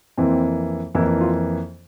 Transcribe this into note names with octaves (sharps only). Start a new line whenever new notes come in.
F2 E3 A#3 C4
F2 E3 A#3 E4
F4